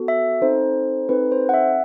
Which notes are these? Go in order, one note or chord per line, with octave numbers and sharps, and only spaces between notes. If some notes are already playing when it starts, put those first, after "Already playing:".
Already playing: B3 F#4 A4
E5
C4 D#4 A4 C5
C4 D#4 A4 B4
C5
F#5
E5